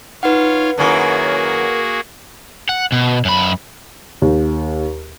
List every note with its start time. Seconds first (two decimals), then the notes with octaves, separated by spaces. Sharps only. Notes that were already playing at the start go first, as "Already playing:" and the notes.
0.23 D#4 F4 B4 C#5 F5 F#5
0.78 F#2 D#3 A#3 E4 F#4 G#4 A#4
2.69 F#5
2.92 B2
3.25 F#2 B5
4.22 D#2